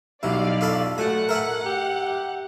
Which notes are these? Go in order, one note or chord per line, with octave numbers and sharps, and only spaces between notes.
B1 G3 E4 D5 F5
F4 A4 B5
A3 F#4 F#5 G#5
A#4 E5 G#5
G4